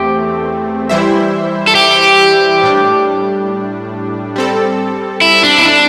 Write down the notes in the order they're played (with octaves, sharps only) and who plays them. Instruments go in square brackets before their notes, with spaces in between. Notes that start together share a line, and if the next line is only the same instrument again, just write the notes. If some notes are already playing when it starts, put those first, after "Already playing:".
Already playing: [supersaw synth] E2 A3 C4 [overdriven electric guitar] G4
[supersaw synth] E3 G3 E4 C5 E5
[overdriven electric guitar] A4
G4
[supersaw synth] A2 G3 D4
G3 C4 A4
[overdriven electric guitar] E4
D4
E4
D4